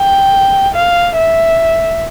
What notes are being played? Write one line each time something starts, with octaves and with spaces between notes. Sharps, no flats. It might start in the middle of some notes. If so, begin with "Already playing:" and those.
Already playing: G5
F5
E5